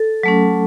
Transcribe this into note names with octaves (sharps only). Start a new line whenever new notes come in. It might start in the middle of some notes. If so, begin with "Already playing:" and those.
Already playing: A4
F#3 A3 C#4